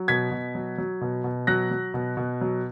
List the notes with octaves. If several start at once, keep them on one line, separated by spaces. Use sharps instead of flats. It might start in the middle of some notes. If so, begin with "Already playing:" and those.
Already playing: F#3
B2 G#6 B6
B2
F#3
F#3
B2
B2
F#3 F#6 A#6
F#3
B2
B2
F#3